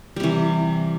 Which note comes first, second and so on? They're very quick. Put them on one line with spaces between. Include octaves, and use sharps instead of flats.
G3 C3 E3